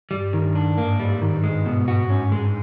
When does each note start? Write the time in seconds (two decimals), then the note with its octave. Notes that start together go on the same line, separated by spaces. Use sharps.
0.10 G2 G3
0.33 D#3
0.44 G2
0.55 D4
0.77 G#2 A#3
1.00 G3
1.22 D#3
1.43 G#3
1.66 B2
1.88 F#4
2.10 C#4
2.32 G#3